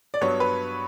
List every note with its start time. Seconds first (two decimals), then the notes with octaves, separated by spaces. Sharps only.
0.14 D5
0.21 G2 F#3 B3 C#5
0.40 B4